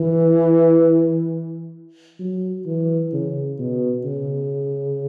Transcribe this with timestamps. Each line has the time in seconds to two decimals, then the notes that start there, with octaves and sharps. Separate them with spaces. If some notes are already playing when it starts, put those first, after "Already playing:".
Already playing: E3
2.19 F#3
2.66 E3
3.13 C#3
3.59 B2
4.06 C#3